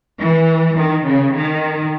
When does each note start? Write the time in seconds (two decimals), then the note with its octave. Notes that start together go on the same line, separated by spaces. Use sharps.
0.18 E3
0.76 D#3
1.05 C#3
1.32 D#3